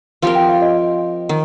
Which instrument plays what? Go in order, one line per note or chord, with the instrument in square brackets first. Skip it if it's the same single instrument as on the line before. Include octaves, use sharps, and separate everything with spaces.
[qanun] F3 C4 G4 A#4
[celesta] G5
F5
D#5
[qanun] D#3